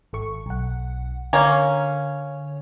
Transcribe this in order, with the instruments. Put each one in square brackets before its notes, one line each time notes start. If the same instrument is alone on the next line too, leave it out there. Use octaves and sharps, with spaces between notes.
[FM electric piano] G#1 A4 C#6
B1 F#5
[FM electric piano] D3 C#5 [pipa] A#3 C#4